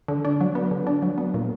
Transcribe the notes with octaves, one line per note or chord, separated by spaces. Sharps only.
D3
D4
F#3
B3
D3
D4
F#3
B3
A#2